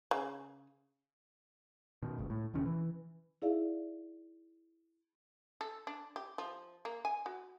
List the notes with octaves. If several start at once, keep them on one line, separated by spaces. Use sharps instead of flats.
C#3
B2 D#3
F#1 C#2
A2
D#1 C3 D#3 C#4
E3
D#4 E4 G#4 D5 E5 F5
A4
D4
G4
F3
A#3
G#5
F#4